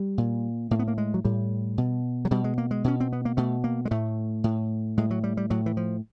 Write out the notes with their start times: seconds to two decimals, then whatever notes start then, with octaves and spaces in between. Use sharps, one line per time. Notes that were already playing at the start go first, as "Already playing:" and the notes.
Already playing: G3
0.18 A#2
0.71 A2 A#3
0.79 B3
0.88 A#3
0.98 G#3
1.14 F#3
1.25 A2 G3
1.78 B2
2.25 F#3
2.31 B2 G3
2.44 G#3
2.58 A#3
2.71 G#3
2.84 B2 C#4
3.00 C4
3.13 B3
3.25 A#3
3.37 B2 A3
3.64 A#3
3.85 G#3
3.91 A2 A3
4.44 A2
4.98 A2 G#3
5.11 F#3
5.24 G3
5.37 G3
5.50 A2 F#3
5.66 E3
5.77 F3